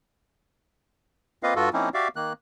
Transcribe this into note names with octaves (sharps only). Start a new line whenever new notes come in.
A#3 C4 F4 B4 D#5 F5
G2 F4 F#4 A4
F3 A#3 C4 C#4 D#4 E4
F#4 G4 D5 E5 F5
D#3 A#3 F#6